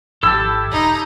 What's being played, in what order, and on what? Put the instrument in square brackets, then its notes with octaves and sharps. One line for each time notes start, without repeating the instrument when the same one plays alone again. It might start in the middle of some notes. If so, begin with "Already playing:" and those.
[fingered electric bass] G#1 F3 [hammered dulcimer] E4 G4 A5 [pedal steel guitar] A4 E6
[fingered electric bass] E1 [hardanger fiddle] D#4